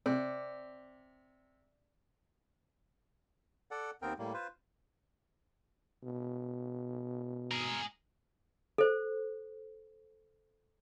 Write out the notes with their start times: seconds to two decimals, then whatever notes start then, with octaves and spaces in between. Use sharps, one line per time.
0.06 C3 D5
3.71 A4 D5 F#5
4.02 D#2 B3 C4 A#4 G5
4.19 A2 G3 A#3
4.34 F4 B4 C5
6.04 B2
7.51 G#4 A#4
8.78 A4 C5